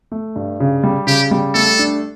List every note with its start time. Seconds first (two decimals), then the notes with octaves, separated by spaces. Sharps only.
0.12 A3
0.36 G2
0.60 C#3
0.84 G3
1.07 C#3 G4
1.31 G3
1.54 A3 A4
1.79 D4